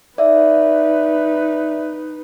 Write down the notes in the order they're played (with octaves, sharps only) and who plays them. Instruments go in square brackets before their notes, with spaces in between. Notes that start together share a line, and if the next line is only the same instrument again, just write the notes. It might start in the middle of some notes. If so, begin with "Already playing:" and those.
[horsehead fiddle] D#4 B4 [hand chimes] D5 E5